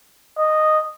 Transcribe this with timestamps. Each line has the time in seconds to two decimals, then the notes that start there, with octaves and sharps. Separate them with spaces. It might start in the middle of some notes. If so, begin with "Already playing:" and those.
0.38 D#5